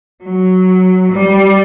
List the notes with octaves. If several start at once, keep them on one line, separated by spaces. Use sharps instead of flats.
F#3
G3